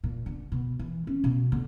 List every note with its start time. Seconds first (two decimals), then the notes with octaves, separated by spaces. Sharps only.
0.04 A#2
0.26 D3
0.52 B2
0.79 E3
1.07 C#4
1.24 B2
1.52 D3